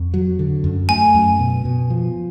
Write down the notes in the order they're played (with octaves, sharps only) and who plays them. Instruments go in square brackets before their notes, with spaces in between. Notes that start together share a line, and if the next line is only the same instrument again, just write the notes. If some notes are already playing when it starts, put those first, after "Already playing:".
Already playing: [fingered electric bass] F2
F#3
D3
F#2
[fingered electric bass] A3 [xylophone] G#5
[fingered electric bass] F#2
B2
B2
F3